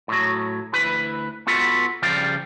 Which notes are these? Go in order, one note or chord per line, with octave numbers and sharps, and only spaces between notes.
A2 F#3
D2 E4 B4 B5
B3 F4 F#4 A4 B4
C#3 F3 G3 D5 F5 G5